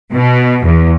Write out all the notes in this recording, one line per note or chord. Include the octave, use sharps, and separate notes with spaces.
B2
E2